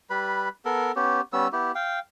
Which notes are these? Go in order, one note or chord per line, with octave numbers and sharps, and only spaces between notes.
G3 B4 B5
B3 A4 A#4
B3 C#4 G4
G3 B3 C#4 E6
B3 E4 G4
F5 G5